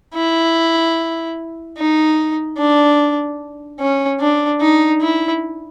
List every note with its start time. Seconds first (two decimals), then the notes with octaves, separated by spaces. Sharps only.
0.15 E4
1.77 D#4
2.58 D4
3.80 C#4
4.20 D4
4.61 D#4
5.01 E4